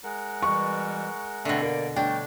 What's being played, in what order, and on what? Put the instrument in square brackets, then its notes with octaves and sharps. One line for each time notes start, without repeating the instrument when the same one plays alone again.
[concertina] G#3 A#4 F#5
[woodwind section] B2 E3 G3 [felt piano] C#6
[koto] B2 D3 [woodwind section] A3 C4
[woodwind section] A#3 D5 [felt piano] A#4
[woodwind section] B2 G3 A3 [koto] D4 [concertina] C#5 [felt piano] G5